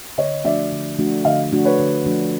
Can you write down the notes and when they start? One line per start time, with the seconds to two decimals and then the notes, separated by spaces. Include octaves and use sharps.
0.18 D3 C#5 D#5
0.45 F3 A3 D4 F#4 D5 E5
0.72 D3
0.99 F3 A3 D4 F#4
1.25 D3 D#5 F5
1.52 F3 A3 D4 F#4
1.65 B4 C#5
1.79 D3
2.05 F3 A3 D4 F#4